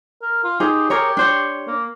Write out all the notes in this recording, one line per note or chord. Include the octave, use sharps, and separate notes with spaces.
A#4
F4
D#4 G4 G#4 C5
G4 G#4 A#4 C#5
D4 C5 C#5
A#3